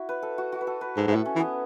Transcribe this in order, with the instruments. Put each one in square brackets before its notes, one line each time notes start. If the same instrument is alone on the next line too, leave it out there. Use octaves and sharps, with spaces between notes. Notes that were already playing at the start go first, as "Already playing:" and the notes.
Already playing: [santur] E4 F#4
B4
A4
F#4
F#4
B4
A4
B4
[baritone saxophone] G#2 [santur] A4
[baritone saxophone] G#2
[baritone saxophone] A2 [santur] E4
[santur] C#4
[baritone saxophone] E3
[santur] B3